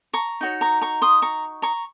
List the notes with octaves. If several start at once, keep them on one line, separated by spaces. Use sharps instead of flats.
A#5 C#6
D#4 F#4 C#5
A#5 C#6
A#5 C#6
C6 D#6
A#5 C#6
A#5 C#6